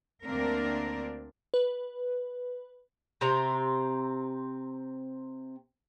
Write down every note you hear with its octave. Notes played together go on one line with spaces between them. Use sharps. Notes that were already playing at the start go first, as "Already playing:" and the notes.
D2 A#3 C4 D4 A#4
B4
C3 C4 A#5